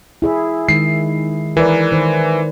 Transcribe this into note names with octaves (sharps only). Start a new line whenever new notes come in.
E4 G#4 E5
D#3 G#3 C7
E3 A#4 B4 D5
D#3 C5